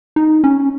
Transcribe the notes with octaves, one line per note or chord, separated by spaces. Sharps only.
D#4
C#4